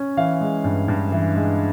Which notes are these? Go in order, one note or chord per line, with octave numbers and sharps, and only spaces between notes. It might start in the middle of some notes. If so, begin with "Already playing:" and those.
Already playing: C#4
E3 F5
G#3
G2
G2
E3
G#3